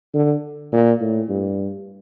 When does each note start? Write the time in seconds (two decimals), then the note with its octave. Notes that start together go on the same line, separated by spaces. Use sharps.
0.14 D3
0.72 A#2
1.01 A2
1.29 G2